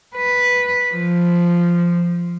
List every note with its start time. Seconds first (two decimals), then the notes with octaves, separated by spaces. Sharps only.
0.15 B4
0.94 F3